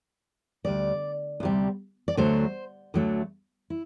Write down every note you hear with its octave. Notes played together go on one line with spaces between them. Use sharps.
D2 C3 G3 D5
D2 C3 G3
D5
D2 D3 F#3 A3 C5
D2 D3 F#3 A3
E4